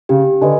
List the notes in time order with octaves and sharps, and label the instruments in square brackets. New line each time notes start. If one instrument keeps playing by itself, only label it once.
[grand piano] C#3 [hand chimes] G4
[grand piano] D3 [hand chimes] B4 D#5 G#5